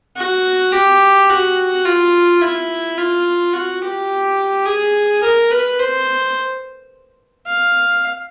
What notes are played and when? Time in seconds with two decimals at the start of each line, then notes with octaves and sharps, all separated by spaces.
0.16 F#4
0.72 G4
1.29 F#4
1.85 F4
2.41 E4
2.97 F4
3.53 F#4
3.82 G4
4.66 G#4
5.23 A#4
5.51 B4
5.79 C5
7.47 F5